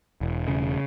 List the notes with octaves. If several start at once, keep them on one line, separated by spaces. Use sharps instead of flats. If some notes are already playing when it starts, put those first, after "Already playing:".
E1
C#3